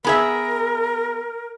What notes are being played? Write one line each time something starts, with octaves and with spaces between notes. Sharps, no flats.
B3 G#4 A#4 E5